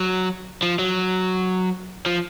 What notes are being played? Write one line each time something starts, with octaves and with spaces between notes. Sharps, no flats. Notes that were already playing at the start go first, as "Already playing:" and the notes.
Already playing: F#3
F3
F#3
F3